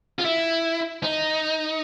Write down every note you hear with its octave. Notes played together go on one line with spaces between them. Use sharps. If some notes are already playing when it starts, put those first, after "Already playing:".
F4
E4
D#4